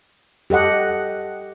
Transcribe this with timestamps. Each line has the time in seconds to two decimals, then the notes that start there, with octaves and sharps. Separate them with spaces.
0.50 G4 A4 D#5 F#5